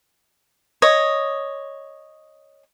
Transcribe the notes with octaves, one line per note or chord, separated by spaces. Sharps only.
C#5 D#5